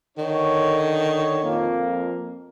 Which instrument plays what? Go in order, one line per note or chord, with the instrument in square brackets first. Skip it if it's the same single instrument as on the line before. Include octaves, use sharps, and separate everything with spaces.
[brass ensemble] D3 D4 C#5 [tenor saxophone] D#3
[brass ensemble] F2 A#3